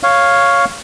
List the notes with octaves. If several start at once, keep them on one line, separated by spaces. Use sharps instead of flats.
C#5 F5